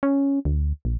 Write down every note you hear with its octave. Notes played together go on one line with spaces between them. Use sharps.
C#4
D2
A#1